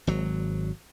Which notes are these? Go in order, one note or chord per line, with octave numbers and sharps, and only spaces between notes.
G#1 F#3